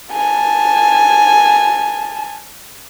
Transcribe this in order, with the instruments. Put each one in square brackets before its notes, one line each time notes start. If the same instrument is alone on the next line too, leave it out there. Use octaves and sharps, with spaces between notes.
[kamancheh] G#5 A5